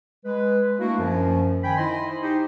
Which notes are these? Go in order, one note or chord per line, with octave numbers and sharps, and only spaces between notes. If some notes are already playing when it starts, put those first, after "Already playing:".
G#3 B4
A3 A#3 D4 E4 F#4
F#2 F3
D#3 G5 G#5 B5
D#4 E4 C5 D#5 B5 C6
D#4 G4 C5